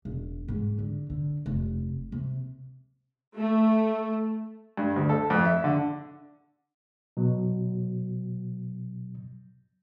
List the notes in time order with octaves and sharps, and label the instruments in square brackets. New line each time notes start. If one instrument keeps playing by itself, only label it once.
[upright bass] E1
G#2
D3
D3
F1
C3
[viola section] A3
[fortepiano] G2
D2
A4
F2
E5
D3
[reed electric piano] B2 F#3